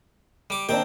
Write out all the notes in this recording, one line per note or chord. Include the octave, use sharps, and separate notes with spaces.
G3 D6
D#3 A#3 C4 D4 G5 A5